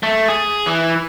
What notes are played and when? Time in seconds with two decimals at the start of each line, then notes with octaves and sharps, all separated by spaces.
0.03 A3
0.28 G#4
0.66 E3